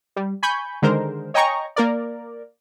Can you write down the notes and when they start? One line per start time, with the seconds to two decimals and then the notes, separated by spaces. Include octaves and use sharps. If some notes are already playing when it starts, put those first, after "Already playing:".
0.16 G3
0.43 G#5 B5 C#6 G6
0.82 D3 D#3 G#3 A#4 C5
1.34 C#5 D#5 G5 G#5 A#5 C#6
1.76 A#3 A#4 D5